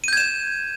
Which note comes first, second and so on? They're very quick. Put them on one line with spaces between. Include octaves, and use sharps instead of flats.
D#7 G6 G#6 E7